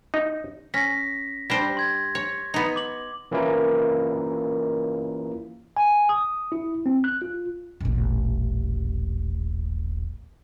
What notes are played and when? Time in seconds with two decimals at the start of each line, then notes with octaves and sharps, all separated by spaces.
0.14 D#4
0.74 C#4 A#6 B6
1.50 G3 D4 C5 A#6
1.77 C6 G#6
2.15 C#5
2.54 B3 D#4
2.76 D6 F#7
3.32 E3 A#3 C#4 E4 F4 A#4
5.77 G#5
6.09 D#6
6.52 E4
6.86 C4
7.04 F#6
7.22 F4
7.81 D#1 A1